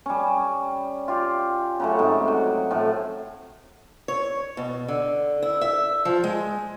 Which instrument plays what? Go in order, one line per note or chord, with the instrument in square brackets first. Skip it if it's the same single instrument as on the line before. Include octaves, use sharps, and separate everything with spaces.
[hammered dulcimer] G3 C#4
F4 G4
C#3 F#3 A3
G#2 C3
F#3
A2 C3 F3
[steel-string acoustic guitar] C#5
B2
D3
E4
E5
F3
G#3